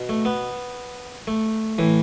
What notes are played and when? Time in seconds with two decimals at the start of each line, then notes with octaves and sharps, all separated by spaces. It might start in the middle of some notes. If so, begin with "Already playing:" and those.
Already playing: B2
0.09 A3
0.25 B3
1.27 A3
1.78 A2 E3